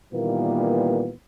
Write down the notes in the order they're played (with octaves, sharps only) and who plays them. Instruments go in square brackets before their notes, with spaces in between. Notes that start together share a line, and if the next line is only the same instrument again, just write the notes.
[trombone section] A#2 D#3 E3 G3 A#3 B3